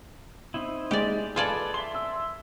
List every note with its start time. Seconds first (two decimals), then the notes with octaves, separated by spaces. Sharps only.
0.54 C4 D#4 E4
0.91 G#3 G4 D5
1.36 F4 G#4 A4 B4 D5 D6 G#6
1.74 E5 C6 G7
1.94 E6